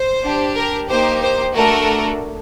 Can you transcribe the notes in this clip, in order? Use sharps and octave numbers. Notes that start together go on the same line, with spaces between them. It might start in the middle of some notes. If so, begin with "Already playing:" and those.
Already playing: C5
D4 G4
A#4
A#3 D#4 G4 C5
C5
A3 D4 F#4 A4 A#4